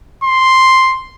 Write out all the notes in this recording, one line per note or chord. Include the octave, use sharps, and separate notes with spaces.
C6